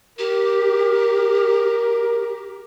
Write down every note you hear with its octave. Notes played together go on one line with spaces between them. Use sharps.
G4 A#4